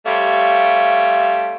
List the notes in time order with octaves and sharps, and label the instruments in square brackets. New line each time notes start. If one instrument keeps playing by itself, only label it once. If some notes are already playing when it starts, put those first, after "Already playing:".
[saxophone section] G3 A3 C4 C#5 F5